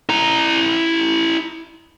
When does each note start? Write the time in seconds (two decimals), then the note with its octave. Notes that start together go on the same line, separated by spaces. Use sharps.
0.09 E4 A#5